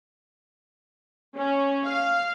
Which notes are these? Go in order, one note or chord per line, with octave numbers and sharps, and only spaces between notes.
C#4
F5